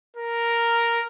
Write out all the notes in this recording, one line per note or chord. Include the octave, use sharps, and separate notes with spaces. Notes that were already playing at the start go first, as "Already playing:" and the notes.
A#4